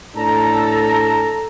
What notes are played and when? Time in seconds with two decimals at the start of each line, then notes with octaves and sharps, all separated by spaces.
0.16 A2 D4 A4 A5 A#5